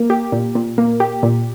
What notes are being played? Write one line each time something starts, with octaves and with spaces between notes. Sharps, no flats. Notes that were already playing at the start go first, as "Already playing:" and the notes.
Already playing: A#3
G4
A#2
A#2
A#3
G4
A#2